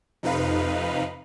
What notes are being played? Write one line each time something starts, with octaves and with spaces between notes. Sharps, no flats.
F2 C3 D#4 B4 F5